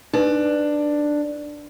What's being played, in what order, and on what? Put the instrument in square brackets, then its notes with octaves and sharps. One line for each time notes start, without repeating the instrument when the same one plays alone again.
[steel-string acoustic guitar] D4 [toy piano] D#4 B4